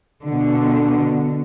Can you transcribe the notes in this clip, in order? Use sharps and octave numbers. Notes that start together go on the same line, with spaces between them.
B2 D3